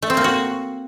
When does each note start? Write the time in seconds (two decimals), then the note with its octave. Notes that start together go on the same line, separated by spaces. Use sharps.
0.02 A3
0.10 C4
0.17 A#3
0.24 F#4